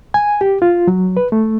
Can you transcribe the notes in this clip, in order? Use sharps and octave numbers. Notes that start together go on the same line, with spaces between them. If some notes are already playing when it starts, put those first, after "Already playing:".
G#5
G4
F4
F#3
B4
A3